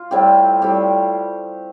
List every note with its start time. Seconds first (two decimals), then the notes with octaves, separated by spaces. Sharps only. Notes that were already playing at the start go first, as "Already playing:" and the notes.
Already playing: F4
0.11 A2 G3 C4 G4
0.62 A2 G3 C4 G4